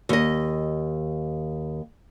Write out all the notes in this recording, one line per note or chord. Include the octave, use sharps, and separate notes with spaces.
D#2 D#5